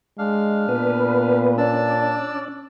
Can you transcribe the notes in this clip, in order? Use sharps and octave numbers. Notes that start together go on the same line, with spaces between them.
G#3 D4 F5
A#2 B3 B4
C#4 D4 D5 A5 E6